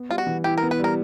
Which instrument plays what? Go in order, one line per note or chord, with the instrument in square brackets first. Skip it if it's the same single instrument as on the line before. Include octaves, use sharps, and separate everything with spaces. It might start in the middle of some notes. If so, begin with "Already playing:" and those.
Already playing: [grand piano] B3
[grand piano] G3 [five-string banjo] F4
[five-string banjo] F#4
[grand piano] E3
[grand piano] E4 [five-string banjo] G4
[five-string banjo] A#4
[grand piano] B3
[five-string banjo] B4
[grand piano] G3 [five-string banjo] A#4